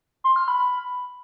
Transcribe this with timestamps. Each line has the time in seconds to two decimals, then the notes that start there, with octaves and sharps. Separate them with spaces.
0.24 C6
0.36 F6
0.48 B5